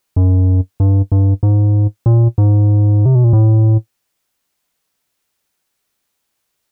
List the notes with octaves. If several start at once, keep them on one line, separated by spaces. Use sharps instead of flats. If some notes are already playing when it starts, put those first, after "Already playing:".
F#2
G2
G2
G#2
A#2
G#2
C3
B2
A#2
A2